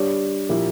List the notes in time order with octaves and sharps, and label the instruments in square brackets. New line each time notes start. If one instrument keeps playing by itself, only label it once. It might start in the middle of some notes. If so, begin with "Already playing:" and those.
Already playing: [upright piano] G3 D4 G4 C#5
A#2 F3 A#3 E4 G4